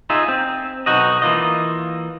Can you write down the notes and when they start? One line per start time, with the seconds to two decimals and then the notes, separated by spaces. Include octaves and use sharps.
0.10 D#4 F4 G#4 E5
0.28 C4
0.86 B1 B2 D#4 F#4 D#5
1.22 E3 A#3 F4 D#5